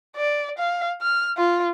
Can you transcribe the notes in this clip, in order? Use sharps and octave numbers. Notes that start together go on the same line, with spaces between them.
D5
F5
F6
F4